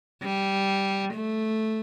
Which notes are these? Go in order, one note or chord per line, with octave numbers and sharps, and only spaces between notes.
G3
A3